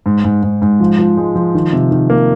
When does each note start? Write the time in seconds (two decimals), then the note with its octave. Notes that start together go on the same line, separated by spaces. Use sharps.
0.06 G#2
0.24 G#2
0.43 G#2
0.62 G#2
0.80 F3
0.99 F3
1.17 G#3
1.35 F3
1.55 D#3
1.73 C3
1.91 D#3
2.10 A#3